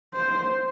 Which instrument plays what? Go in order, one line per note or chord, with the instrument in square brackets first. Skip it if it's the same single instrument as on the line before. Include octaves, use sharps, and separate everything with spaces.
[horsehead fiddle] C5